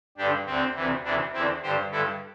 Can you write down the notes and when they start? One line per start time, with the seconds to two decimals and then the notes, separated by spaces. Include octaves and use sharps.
0.17 G2 D3 D4 G4
0.47 D2 D3 C4
0.75 D2 C3 E3
1.04 D2 C3 E3 D4
1.33 E2 D3 C4 E4
1.62 G2 D3 G4 C5
1.91 G2 D3 E4 A4